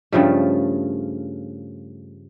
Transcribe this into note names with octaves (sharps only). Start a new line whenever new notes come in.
G2 C#3 F3 A3